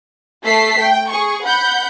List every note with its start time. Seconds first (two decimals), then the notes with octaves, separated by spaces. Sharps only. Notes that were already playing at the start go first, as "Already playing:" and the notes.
0.43 A3 A4 B6 C7
0.79 G5
1.11 G#4 C#6
1.45 F#5 B5 G6